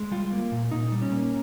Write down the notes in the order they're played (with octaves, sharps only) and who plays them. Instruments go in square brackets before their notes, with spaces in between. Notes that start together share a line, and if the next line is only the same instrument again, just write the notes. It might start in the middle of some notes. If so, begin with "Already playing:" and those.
Already playing: [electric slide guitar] G#3
G3 F4
A#3
A#2
A#2 D#4
G3
C#4
A#3